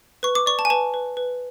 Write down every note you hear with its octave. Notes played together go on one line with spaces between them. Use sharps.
B4 C#6
D6
D5 C#6
A5
G#5
B4 A5
B4
B4